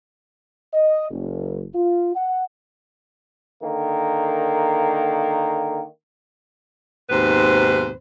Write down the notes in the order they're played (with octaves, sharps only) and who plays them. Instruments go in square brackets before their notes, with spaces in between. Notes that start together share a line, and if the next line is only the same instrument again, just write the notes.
[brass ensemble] D#5
F#1
F4
F#5
[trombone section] D3 D#3 A#3
[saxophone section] D#2 G#2 B2 C4 B4 C5